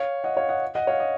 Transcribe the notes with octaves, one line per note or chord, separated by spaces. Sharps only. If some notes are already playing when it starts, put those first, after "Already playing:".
Already playing: C#5 F5
D#5 F#5
C#5 F5
D#5 F#5
D#5 F#5
C#5 F5
D#5